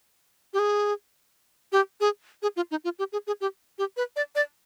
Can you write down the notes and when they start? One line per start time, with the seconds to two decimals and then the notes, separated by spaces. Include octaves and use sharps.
0.53 G4
0.59 G#4
1.72 G4
2.00 G#4
2.42 G#4
2.56 F4
2.71 D#4
2.84 F4
2.99 G4
3.12 G#4
3.27 G#4
3.41 G4
3.78 G4
3.97 B4
4.16 D5
4.35 D5